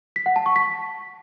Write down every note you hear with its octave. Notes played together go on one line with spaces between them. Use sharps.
B6
F#5
A5
C#6
B6